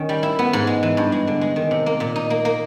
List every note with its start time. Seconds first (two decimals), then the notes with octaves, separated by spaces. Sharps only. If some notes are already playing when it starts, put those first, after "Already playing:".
Already playing: D#3 C#4
0.09 G3
0.23 E4
0.39 B3
0.53 G#2
0.67 G#3
0.83 E3
0.97 G2
1.12 G#3
1.27 D3
1.41 G#3
1.56 D#3
1.71 C3
1.86 A#3
2.00 A#2
2.16 D#4
2.30 A#3
2.45 A#3